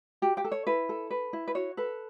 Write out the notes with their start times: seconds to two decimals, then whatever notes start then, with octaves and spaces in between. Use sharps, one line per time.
0.22 F#4 G4 G5
0.37 G4 G5
0.44 A4
0.52 C#5
0.67 E4 B4
0.89 A4
1.11 B4
1.33 E4
1.48 B4
1.55 F#4 C#5
1.77 A4 B4